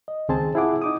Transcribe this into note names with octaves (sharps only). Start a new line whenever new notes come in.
D#5
C#2 D#3 C4 G#4 C5 A5
E4 F4 G#4 F#5 D6
D#4 D6 D#6